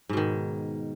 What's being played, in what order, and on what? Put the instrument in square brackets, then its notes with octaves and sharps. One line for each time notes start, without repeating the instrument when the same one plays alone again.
[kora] G#2
B2
D#3